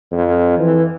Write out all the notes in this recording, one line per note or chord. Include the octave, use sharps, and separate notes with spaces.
F2
E3